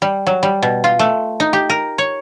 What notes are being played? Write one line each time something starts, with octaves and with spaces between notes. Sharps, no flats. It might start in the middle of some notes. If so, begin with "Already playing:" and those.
G3
F#3
G3
B2
F4
A3
D#4
G4
A#4
C#5